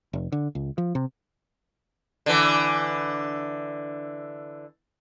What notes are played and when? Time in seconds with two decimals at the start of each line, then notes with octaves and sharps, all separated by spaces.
0.13 F1
0.32 D3
0.55 C#2
0.78 F3
0.95 C3
2.26 D3 E3